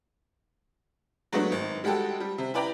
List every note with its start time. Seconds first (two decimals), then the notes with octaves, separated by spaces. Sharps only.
1.32 F#3 G#3 A3 B3 D4
1.52 G#1
1.84 G3 G#3 F#4 G4 A4
2.20 G3
2.38 C3
2.54 E4 B4 D5 G5 A#5 B5